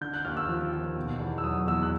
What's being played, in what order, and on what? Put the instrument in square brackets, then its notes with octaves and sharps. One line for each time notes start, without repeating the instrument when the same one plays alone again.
[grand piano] D3 G6
F#6
D#2 F6
E6
F3
D#2
B2
E2
E6
F#3 D#6
E2 E6
F#6